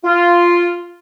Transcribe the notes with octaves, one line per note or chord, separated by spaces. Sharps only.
F4